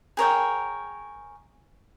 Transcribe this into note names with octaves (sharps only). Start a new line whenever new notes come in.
G#4 A#4 C#5 G5